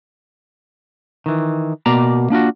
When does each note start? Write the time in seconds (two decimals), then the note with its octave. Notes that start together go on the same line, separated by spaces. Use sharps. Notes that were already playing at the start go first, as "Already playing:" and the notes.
1.26 D#3 E3
1.86 B2 A#3 D5 A#5
2.30 A#3 D4 F4 F#4